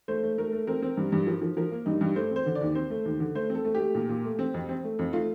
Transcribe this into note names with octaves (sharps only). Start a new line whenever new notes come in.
A3 C5
A3
A3 A#4
A3
C4 A#4
C4
G2
G2
F3
F3
F3 A#4
A#3
G2 D#4
G2
A3 C5
C4 C5
D3
D5
D#2
C4 C5
A3
D#2
D3
A3 C5
C4
A4
A3
G4
A3
A#2
A#2
A3
C4
F2
C4
A3
F2
A3 F4